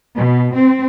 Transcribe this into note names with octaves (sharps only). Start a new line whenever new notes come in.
B2
C4